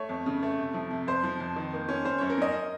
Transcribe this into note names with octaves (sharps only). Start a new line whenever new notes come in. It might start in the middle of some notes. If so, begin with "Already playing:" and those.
Already playing: A3 C#5
F2
C#3
A3
C3
F3
C3
F2 C5
F3
F2
D#3
A#3
C#4
C#4 C5
F#2 C#5
A#4
C#4 D#5